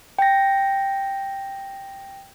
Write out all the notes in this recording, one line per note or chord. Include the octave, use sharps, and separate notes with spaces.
G5 A#6